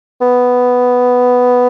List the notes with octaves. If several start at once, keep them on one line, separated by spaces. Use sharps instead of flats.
B3